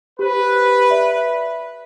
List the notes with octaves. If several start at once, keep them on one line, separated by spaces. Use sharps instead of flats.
G4 B4 C5
D5 E5